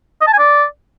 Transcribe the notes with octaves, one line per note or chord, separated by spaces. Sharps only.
D#5
A5
G#5
D5